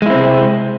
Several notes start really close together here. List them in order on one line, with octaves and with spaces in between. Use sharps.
G#3 E4 C4 C3